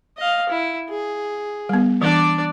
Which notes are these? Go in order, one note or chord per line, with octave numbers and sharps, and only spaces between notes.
D#5 F5
E4
G#4
G3 B3
E3 D4 D5